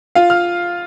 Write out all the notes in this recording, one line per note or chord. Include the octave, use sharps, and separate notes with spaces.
F4 F5
F6